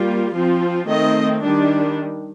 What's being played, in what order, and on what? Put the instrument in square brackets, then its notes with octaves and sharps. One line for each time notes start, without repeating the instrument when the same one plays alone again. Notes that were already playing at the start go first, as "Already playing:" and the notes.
Already playing: [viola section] G3 A#3 F4
F3 C4 F4
D#3 A3 C4 D#5
D#3 G3 D4